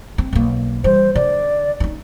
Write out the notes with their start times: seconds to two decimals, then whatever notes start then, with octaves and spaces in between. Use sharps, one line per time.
0.18 C4
0.33 B1 A#3
0.84 E3 G3 C5
1.15 D3 D5
1.80 C#4 D#4